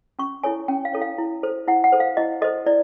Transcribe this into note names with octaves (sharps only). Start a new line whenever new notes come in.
C#4 C#6
E4 A4 C#5 G#5
C#4 G5
F5
E4 A4 C#5
F5
E4
A4 C5
E4 F#5
F#5
A4 C5
F5
E4 D#5
A4 C5 D#5
E4 D5